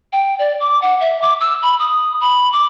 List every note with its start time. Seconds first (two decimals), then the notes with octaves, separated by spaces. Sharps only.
0.13 G5
0.39 D5
0.60 D6
0.82 F#5
1.01 E5
1.22 D6
1.41 E6
1.62 B5
1.79 D#6
2.21 B5
2.53 D6